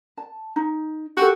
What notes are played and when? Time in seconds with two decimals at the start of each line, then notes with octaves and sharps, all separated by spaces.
0.17 A5
0.56 D#4
1.17 F#4 G4 A4